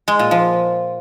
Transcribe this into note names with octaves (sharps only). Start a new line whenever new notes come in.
G#3
A#2
F3